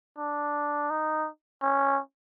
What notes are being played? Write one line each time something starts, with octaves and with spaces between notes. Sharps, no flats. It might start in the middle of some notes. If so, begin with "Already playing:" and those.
D4
D#4
C#4